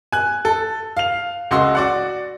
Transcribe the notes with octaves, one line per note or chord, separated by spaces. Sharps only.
G#5 F#6
A4
F5 F7
C#2 F#4 D#5 C6 E6
F#4 D5 F#5